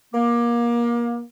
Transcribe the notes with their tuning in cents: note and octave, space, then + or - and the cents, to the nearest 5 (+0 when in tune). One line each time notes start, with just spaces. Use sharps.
A#3 +25